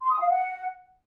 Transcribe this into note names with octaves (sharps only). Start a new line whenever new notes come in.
C6
D#6
F5
F#5